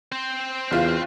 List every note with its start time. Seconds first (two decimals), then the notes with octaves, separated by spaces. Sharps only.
0.12 C4 C5
0.71 F#1 E2 F4 F5